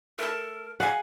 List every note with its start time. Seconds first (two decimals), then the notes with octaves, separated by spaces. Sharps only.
0.19 A3 A4 A#4
0.80 G#4 F5 F#5 G#5